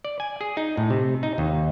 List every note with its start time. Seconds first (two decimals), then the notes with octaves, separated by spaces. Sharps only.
0.05 D5
0.20 G#5
0.41 G#4
0.57 D#4
0.77 A2
0.90 C3
1.23 D#4
1.38 D#2